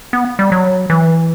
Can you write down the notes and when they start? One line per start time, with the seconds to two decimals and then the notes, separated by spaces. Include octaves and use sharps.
0.13 B3
0.39 G3
0.52 F#3
0.90 E3